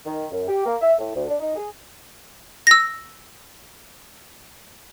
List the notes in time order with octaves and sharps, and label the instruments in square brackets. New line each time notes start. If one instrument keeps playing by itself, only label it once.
[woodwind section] D#3
F#2
G4
A#3
E5
A2
D2
D4
D#4
G#4
[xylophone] E6 A#6